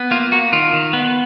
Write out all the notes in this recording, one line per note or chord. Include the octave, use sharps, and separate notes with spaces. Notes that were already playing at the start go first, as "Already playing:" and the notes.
Already playing: B3
A#3 F4
A#3 F#4
D#3 F4
D#3
B3